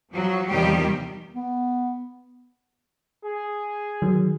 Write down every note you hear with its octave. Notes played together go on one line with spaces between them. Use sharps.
F3 F#3
E2 C3 D#3 F3 G3 G4
B3
G#4
D#3 F#3